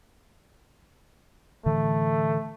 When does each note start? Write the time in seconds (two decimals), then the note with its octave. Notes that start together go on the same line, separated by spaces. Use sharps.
1.66 A2 D3 E3 A3